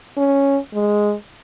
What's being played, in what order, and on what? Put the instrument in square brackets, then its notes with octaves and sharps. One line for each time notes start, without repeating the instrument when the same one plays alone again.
[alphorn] C#4
G#3